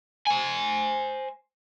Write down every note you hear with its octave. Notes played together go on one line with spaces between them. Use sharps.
C5 G#5